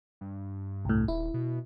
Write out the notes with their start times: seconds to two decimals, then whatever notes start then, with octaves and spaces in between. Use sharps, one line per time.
0.21 G2
0.85 C2 A2
1.08 D#1 E4
1.34 B2